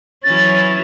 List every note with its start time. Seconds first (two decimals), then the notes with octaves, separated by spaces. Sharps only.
0.24 E3 F#3 C#4 A6